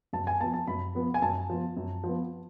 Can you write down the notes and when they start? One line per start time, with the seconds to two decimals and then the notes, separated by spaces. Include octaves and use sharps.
0.13 F#2 A5
0.27 G#5
0.41 F3 B3 A5
0.54 A5
0.67 F#2 B5
0.95 F3 B3
1.14 G#5
1.22 F#2 A5
1.50 F3 B3
1.77 F#2
2.04 F3
2.09 B3